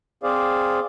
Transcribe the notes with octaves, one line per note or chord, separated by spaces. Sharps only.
C4 G#4 C5 D5 F5